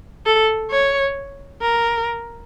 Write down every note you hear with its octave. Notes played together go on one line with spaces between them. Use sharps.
A4
C#5
A#4